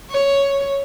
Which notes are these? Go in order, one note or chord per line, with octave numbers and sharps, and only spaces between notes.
C#5